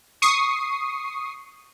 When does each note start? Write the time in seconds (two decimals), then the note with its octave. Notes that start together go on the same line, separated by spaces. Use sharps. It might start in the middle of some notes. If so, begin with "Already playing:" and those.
0.22 C#6 D#6 C7